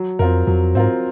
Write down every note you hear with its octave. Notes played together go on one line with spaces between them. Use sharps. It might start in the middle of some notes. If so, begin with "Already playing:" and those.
Already playing: F#3
F2 C4 F4 A#4
F2 F#3
G#2 C4 F4 A#4